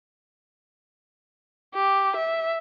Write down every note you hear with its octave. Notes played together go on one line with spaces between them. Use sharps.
G4
E5